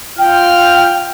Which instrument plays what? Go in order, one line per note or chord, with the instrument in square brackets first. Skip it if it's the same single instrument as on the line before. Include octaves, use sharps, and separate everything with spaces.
[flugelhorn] F4 [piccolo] G5 [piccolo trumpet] F6